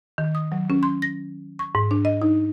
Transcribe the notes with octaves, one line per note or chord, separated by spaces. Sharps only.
D#3
D#6
F#3
C#4
C6
A#6
C#6
G#2
D4
D#5
D#4